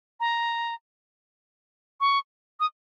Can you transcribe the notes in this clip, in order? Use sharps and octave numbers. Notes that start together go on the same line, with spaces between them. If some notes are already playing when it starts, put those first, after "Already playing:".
A#5
C#6
D#6